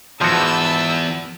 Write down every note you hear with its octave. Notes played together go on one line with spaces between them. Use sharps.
E2 G#2 F3 F#4 B4 A5 E6